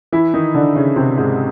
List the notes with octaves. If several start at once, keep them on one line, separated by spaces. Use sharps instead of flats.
E3 E4
D#3 D#4
D3 D4
C#3 C#4
C3 C4
G#2 G#3